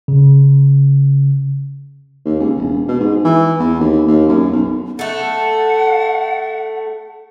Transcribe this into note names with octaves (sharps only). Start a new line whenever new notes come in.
C#3
D#2
C#2
E1
B2
G#2
E3
E2
D#2
D#2
F#2
B1
A3 A4 F#5